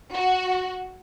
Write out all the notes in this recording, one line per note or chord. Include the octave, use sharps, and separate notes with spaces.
F#4